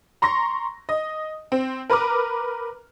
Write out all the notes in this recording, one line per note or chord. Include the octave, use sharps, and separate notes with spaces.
A#5 C6 C#6 A#6
D#5
C4
A#4 B4 A#5 D6 F6